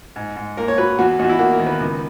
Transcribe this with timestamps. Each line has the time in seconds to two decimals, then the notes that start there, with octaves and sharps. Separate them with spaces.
0.16 G#2
0.36 G#2
0.57 A#3 A#4
0.68 C#5
0.78 F#3 B4
0.99 E2 F#4
1.19 E2 D#4
1.24 F#4
1.29 E4
1.39 A#3 F#4
1.53 A#4
1.60 D#3
1.66 B4
1.80 C#2